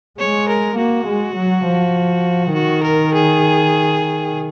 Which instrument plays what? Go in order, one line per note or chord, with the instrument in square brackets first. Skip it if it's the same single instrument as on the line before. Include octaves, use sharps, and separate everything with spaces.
[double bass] G#3 [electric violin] C#5
[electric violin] A#4
[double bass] A#3 [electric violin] F#4
[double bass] G#3
F#3
F3
[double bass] D#3 [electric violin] F#4
[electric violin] A#4
G#4